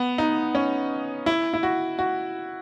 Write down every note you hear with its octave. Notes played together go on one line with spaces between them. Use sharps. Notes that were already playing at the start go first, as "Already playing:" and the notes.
Already playing: B3
D#4
C#4
E4
E4
F#4
F#4